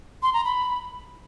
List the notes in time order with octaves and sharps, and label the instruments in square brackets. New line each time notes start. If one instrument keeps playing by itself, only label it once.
[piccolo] C6
A#5
B5